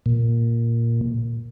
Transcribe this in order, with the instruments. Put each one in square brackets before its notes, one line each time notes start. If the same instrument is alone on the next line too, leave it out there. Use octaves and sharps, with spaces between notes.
[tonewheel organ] A#2